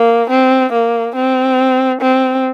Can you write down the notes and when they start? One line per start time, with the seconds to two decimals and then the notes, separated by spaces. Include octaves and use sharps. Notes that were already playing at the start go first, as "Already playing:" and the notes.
Already playing: A#3
0.30 C4
0.72 A#3
1.15 C4
2.01 C4